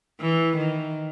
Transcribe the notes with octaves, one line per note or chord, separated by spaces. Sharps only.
E3
D#3